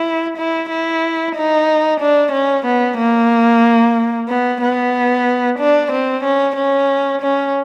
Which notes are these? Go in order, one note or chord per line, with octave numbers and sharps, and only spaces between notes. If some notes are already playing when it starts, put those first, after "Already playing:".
Already playing: E4
E4
E4
D#4
D4
C#4
B3
A#3
B3
B3
D4
C4
C#4
C#4
C#4